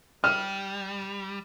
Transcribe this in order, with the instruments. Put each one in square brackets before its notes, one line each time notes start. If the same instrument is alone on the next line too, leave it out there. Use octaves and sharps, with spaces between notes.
[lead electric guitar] G3 [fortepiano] F6